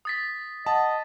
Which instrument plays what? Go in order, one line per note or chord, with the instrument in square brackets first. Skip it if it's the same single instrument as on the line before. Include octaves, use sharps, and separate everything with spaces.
[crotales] D#6 A6 B6
[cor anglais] D#5 [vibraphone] F#5 [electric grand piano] A5